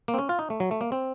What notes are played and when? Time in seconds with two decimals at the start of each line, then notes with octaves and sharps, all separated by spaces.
0.08 A#3
0.14 C4
0.19 C#4
0.29 F4
0.39 D#4
0.50 A3
0.60 F#3
0.71 A3
0.81 A#3
0.92 C4